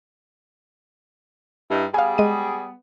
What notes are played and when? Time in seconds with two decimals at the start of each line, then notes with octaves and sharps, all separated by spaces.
1.71 G2 D#4 E4
1.94 G3 B3 G#4 F5 G#5
2.18 G#3 D#7